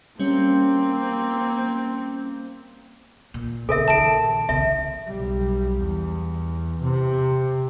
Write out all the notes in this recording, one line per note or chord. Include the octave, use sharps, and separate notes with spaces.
G3 A#3 C4 C#4
A#2
C#3 A4 A#4 E5
A#1 D#3 A5 D7
C2 C#3 E5
B1 G3
E2
C3